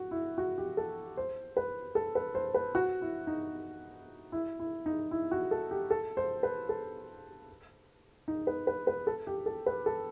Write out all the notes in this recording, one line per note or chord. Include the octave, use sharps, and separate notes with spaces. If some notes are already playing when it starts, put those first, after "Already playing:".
Already playing: F#4
E4
F#4
G4
A4
C5
B4
A4
B4
C5
B4
F#4
E4
D#4
E4
E4
D#4
E4
F#4
A4
G4
A4
C5
B4
A4
D#4
B4
B4
B4
A4
G4
A4
B4
A4